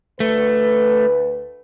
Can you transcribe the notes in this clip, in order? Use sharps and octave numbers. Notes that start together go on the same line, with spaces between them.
D2 A3 B4